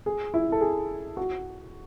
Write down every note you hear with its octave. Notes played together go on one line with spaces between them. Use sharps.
G#4
E4
A4
G#4
F#4